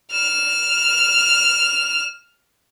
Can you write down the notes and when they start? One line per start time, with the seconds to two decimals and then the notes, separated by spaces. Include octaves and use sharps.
0.12 F6 E7